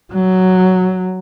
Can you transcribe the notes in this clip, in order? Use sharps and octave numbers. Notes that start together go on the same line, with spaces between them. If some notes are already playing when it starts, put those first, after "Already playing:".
F#3